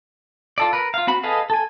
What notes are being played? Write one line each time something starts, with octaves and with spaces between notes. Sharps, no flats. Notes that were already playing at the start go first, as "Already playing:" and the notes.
F4 A4 D5
A#4 B4
F4 F5
C4 F#4 B5
G#4 A4 B4 D#5 F5
A4 G#5